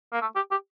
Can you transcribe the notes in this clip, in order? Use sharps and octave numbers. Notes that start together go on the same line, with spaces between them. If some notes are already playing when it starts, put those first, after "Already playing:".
A#3
A3
G4
G4